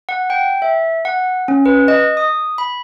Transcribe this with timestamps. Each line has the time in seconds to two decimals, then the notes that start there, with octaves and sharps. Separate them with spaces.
0.09 F#5
0.30 G5
0.62 E5
1.05 F#5
1.48 C#4
1.66 B4
1.88 D#5
2.17 D#6
2.58 B5